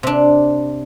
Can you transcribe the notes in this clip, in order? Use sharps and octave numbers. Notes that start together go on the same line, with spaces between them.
C3 D4